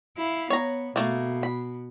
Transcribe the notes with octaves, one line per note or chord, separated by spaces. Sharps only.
E4 F5
B3 C#5 A#5
B2 A3 A#3
B5